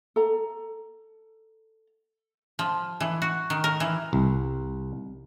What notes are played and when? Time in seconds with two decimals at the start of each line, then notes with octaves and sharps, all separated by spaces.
0.16 A4 A#5
2.59 F3
3.00 E3
3.22 F#4
3.50 D#3
3.64 A#4
3.80 E3
4.13 C2